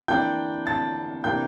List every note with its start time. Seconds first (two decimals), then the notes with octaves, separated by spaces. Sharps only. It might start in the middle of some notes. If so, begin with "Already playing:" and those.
0.08 E3 A#3 D4 G5 G6
0.66 A5 A6
1.24 C3 E3 A#3 D4 G5 G6